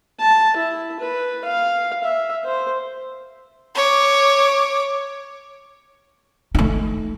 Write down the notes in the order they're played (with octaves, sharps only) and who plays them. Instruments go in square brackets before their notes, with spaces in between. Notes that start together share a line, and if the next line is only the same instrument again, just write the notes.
[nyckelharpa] A5
E4
B4
F5
E5
C5
[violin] C#5 D6
[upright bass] A3 D#4